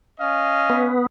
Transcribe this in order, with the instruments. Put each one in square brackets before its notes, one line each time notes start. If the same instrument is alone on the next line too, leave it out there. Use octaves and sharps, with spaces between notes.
[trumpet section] C#4 D#5 F5
[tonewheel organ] B3